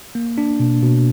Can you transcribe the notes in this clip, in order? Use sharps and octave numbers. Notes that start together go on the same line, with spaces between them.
A#3
D4
B2
B2